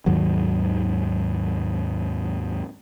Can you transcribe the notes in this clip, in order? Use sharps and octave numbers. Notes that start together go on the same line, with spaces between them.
D#2 G#2 D#3 F#3